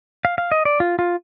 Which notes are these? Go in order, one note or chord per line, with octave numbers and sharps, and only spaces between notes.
F5
F5
D#5
D5
F4
F4